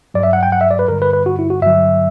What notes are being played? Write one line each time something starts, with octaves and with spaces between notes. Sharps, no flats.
G2 F#3 D5
E5
F#5
G5
F#5
E5
D5
B4
G2 D3 G3 A#4
B4
B4
F#4
E4
F#4
G2 D3 F#3 E5